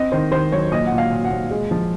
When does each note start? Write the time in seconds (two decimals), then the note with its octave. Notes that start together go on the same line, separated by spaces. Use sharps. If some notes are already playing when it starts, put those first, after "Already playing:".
Already playing: C4 D#5
0.12 D#3 C5
0.31 D#3 C5
0.52 F#3 C#5
0.71 A#2 D#5
0.86 F#5
0.92 A#2
0.98 F5
1.11 A#2
1.25 F#5
1.30 A#2
1.50 G#3
1.71 F3